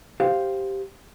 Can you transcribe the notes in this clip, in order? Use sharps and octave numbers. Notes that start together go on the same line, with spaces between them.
G4 C5 F5